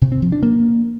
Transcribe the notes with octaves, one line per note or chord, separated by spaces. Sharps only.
C3
C4
F3
D4
A#3